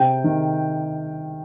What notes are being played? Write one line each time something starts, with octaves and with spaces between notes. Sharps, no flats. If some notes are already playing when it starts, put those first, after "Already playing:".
Already playing: C3 G5
D#3